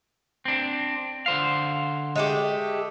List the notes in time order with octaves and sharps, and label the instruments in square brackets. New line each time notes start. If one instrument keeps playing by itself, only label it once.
[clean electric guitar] C4 D4
D3 C5 F5
[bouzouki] G#3 A3 G4